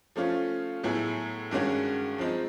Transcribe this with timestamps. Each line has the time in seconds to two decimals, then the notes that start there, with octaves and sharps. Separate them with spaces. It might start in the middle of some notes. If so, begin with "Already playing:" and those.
0.16 F3 A3 C#4 F4
0.83 A2 F#3 B3 E4 G#4
1.51 G2 D#3 G#3 C#4 F#4
2.18 F3 G#3 C4 D#4